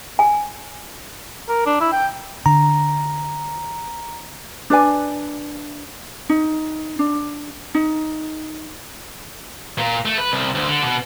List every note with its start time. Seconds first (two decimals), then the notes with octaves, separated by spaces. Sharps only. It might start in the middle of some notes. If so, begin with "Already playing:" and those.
0.19 G#5
1.49 A#4
1.66 D4
1.81 E4
1.93 G5
2.46 D3 A#5
4.70 D4 B4 D5 G#5
6.29 D#4
6.99 D4
7.75 D#4
9.78 A#2
10.06 A3
10.18 B4
10.32 C2
10.55 D2
10.68 D3
10.83 B2